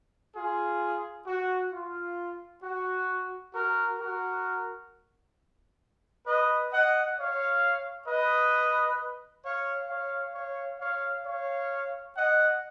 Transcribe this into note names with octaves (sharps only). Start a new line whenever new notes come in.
F4 G#4
F#4
F4
F#4
F#4 A#4
F#4 A#4
B4 D#5
D#5 F#5
C#5 F5
B4 D#5
C#5 F5
C#5 F5
C#5 F5
C#5 F5
C#5 F5
D#5 F#5